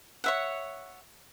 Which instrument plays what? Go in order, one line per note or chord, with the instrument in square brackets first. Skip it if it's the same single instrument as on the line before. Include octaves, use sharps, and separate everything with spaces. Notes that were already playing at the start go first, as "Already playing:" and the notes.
[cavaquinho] C#5 E5 F#5